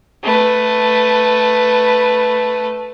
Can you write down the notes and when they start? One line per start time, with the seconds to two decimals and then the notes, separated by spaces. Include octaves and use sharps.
0.23 A3 B4